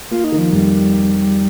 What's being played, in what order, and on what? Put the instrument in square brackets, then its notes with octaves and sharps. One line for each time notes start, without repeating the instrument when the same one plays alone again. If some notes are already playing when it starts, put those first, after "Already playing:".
[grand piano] A#3 [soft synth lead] F4
[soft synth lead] D#4
[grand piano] D#3
[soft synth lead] F3
[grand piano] F2 [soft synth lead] G3